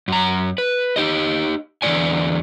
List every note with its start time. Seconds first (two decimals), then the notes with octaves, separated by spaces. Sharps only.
0.08 F#2 A#5
0.58 B4
0.96 D#4 G4 D#5
1.82 E2 D3 G3 G4 D5 G#5